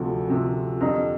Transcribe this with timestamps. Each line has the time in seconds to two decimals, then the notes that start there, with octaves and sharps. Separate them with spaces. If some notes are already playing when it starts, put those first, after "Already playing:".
Already playing: D2 C3 F3
0.28 D2 C3 F3
0.81 F2 D3 G3 A#5